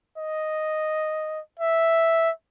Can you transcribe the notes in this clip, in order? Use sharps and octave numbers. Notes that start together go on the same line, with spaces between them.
D#5
E5